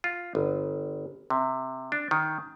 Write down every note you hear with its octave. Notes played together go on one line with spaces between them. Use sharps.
F4
G1
C3
D4
D#3